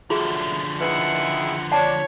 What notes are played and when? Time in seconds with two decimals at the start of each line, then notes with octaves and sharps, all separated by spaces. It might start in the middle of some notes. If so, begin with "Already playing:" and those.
0.10 D3 F3 F#3 A3 B3 F4 F#4 G#4
0.81 D#3 E4 G#4 B4 F#5
1.72 D4 C#5 F#5 A5